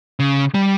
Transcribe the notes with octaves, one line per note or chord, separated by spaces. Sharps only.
C#3
G3